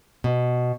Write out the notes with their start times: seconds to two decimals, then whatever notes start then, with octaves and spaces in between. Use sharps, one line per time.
0.24 B2